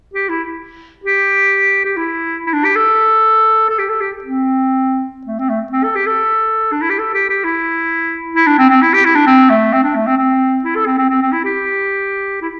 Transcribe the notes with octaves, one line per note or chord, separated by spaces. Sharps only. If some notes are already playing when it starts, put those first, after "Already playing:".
G4
E4
G4
G4
E4
E4
D4
G4
A4
A4
G4
A4
G4
C4
A3
C4
A3
C4
A4
G4
A4
D4
E4
G4
A4
G4
G4
E4
E4
D4
C4
C4
E4
G4
E4
D4
C4
A3
C4
D4
A3
C4
C4
E4
A4
C4
C4
C4
C4
E4
G4
E4